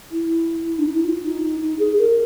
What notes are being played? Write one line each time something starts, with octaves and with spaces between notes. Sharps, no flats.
E4
D4
D#4
E4
F4
D#4
D#4
D#4
G#4
A#4